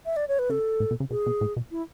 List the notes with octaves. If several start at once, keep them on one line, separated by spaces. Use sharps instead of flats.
E5
D5
C#5
B4
C#3 A4
A2
B2
C#3
B2 G#4
B2
A2
B2
E4